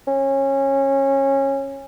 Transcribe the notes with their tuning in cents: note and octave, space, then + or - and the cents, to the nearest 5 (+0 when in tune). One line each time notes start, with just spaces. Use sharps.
C#4 -20